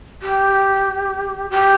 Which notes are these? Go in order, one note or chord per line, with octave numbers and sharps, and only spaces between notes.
G4
G4